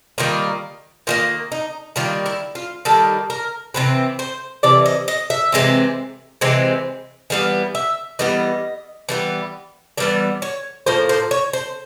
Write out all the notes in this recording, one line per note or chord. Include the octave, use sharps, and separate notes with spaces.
D#3 G3 A#3 F4
D#3 G3 A#3 F4
D#4
D#3 G3 A#3 F4
E4
F4
D#3 G3 A#3 A4
A#4
C3 E3 C4 B4
C5
C3 E3 D5
D#5
D#5
E5
C3 E3 G#3 C4
C3 E3 G#3 C4
E3 G3 B3 F5
E5
E3 G3 B3 D#5
E3 G3 B3
E3 G3 B3 D5
C#5
A2 F3 A#3 C5
C5
C#5
C5